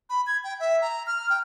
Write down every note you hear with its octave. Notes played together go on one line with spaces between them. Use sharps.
B5
G#6
G5
E5
A#5
F6
G5